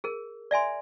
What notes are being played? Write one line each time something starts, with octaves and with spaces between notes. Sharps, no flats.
G#4 A#4
D5 E5 G#5 C6